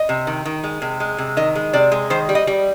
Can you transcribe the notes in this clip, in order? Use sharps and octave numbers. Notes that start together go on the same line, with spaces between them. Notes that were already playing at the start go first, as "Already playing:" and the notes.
Already playing: D#5
C3
D#3
D#3
G#3
C3
G#3
C3
D#3 D#5
G#3
C3 D5
G#3
D#3 C5
G3
D#5
G3